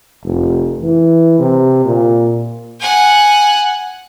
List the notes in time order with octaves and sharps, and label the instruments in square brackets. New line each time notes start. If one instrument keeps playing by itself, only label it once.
[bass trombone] F1
E3
C3
A#2
[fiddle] F#5 G#5